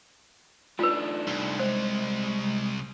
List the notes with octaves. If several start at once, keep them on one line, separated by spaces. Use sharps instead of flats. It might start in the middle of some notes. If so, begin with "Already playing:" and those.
A3 D4 D#4 F4 B4
C2
G#3 C5